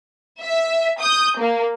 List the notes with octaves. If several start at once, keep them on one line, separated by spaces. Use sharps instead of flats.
E5
D#6 G6
A#3